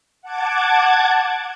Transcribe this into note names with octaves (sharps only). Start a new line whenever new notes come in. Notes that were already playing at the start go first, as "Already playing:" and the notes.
F#5 A5 D6 G#6